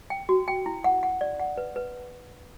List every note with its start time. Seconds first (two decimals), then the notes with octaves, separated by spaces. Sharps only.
0.10 G5
0.29 F#4
0.48 G5
0.66 E4
0.84 F#5
1.03 F#5
1.21 D5
1.39 F#5
1.57 B4
1.76 B4